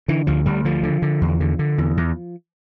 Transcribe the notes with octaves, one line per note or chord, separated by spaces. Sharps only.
D3 E3
D2 F3
D2 G3
D3 F3
D3
D3
E2
D3
D3
E2
E2